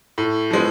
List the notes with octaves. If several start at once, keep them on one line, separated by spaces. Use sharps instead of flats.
A2
F3 G#3 B3